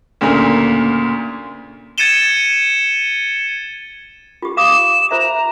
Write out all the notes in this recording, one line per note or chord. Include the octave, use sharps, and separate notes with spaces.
D2 A#2 C#3 A#3
G#6 A6 C#7 D#7 E7 G7
F4 G4
F5 D6 D#6 E7
F4 C5 E5 A#5